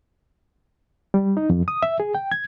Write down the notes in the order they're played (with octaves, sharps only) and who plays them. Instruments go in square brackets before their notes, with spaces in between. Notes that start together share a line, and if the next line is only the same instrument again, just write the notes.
[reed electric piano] G3
D#4
F2
D#6
E5
G#4
G5
G#6